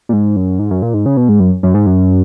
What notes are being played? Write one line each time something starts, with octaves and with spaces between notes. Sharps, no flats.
A#2
G#2
F#2
G#2
F#2
A#2
G#2
C#3
B2
G#2
F#2
F#2
G#2
F#2